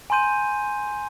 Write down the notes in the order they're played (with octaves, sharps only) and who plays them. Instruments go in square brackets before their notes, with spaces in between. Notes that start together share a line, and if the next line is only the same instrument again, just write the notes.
[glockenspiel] G#5 A#5 C6 G6 D#7